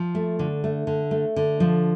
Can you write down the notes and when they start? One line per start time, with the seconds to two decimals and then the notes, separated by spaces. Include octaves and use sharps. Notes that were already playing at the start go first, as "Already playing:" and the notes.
Already playing: F3
0.15 A3
0.39 D3
0.64 A3
0.87 D3
1.11 A3
1.36 D3
1.60 F3